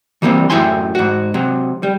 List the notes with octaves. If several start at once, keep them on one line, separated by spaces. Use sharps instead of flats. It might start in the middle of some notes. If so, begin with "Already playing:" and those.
E3 G3 A#3 C4
F#2 A2 E4 G5 G#5 C6
G#2 F#4
C3 F#3
G3